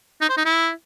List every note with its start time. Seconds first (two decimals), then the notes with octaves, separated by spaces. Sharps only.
0.22 D#4
0.29 C5
0.37 D#4
0.45 E4